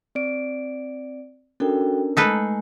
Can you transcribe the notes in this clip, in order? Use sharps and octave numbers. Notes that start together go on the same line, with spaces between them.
C4 D5 D7
C#4 D4 F#4 A4 A#4 G5
G#3 A3 D#4 A4 B4 G#5